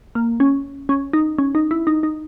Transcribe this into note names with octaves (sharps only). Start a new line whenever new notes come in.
A#3
C#4
C#4
D#4
C#4
D#4
E4
D#4
D#4